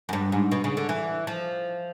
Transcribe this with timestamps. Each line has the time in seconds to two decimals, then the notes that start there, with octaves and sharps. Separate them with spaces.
0.09 F#2
0.13 G2
0.32 G#2
0.52 B2
0.64 C#3
0.77 D3
0.89 E3
1.27 F3